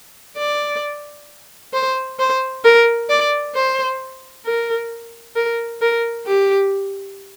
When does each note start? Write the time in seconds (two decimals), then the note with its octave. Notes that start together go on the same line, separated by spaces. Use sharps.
0.38 D5
1.73 C5
2.19 C5
2.64 A#4
3.09 D5
3.55 C5
4.45 A#4
5.35 A#4
5.81 A#4
6.26 G4